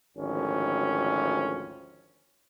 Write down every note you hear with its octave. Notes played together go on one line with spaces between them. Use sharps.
G#1 D2 F3 C#4